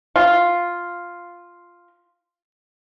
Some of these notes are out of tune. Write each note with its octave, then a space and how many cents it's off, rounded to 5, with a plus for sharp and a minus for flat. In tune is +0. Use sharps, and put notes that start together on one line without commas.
F4 +0 F5 +0